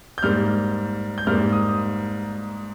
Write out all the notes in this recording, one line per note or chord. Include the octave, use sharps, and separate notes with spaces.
G6
G#2 G3 A#3 F6
G6
G#2 G3 A#3 F6
D#6